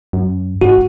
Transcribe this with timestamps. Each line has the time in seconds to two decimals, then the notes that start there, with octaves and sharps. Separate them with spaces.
0.13 F#2
0.61 G#1 F#4